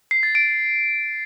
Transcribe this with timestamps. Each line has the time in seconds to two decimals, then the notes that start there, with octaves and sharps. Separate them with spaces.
0.11 C7
0.23 A6
0.35 D7